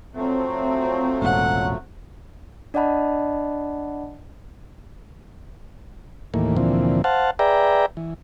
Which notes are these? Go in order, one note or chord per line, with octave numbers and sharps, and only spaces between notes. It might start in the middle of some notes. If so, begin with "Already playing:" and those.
F3 F#3 A3 C4
E1 A1 A#2 F#5
D4 D5 D#5 F#5 A5 B5
D#2 A2 E3 A#3
D2 A#2 E3 F3 C4
C5 F5 F#5 A5
G#4 B4 D5 E5 G5 A#5
E3